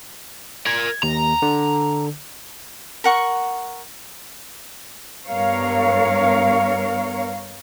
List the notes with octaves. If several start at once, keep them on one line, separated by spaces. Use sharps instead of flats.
A#4 D5 G#6
D#2 A#5
D3
A#4 F#5 C#6
G2 B3 A#4 C#5 F5